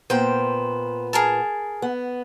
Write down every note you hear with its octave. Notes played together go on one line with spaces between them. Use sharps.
A#2 B3 C5 G5
G#4 A#4 A5
B3